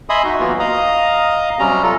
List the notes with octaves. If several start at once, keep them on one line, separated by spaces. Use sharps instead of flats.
D#5 E5 G#5 B5 C6 D#6
D#4 F#4
E3 F#3 A#3 B3 F4 F#4
D#5 F5 A#5 D#6
C3 F#3 G3 C#4 A#5
F4 A4